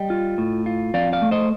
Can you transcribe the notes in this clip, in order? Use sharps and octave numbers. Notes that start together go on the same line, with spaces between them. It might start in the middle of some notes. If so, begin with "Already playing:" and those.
Already playing: G3 D#5 G5
F4
A2
F4
F2 D5 F5
D5 F5
A3
C5 D#5